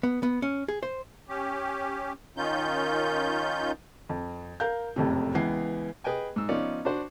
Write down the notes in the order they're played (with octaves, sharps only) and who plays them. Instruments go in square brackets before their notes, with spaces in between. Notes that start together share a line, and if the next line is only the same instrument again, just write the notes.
[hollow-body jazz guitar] B3
B3
C#4
G#4
C5
[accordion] C#4 G4
D#3 C#4 D#4 F4 G6
[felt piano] F2
A#4 F5 G6
F#1 F2 A2 C3
C#2 E3 B3 C7
[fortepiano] G#4 B4 D#5 G5 G#5
G#2 E6
F3 B3 C#4 D#4 D5
D4 F#4 C5